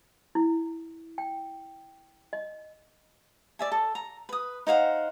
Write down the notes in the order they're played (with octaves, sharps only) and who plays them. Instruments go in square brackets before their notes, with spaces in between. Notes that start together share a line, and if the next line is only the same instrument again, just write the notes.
[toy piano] E4
G5
D#5
[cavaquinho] D5 E5 G#5
A4
A#5
B4 D#6
D#4 C5 F5 F#5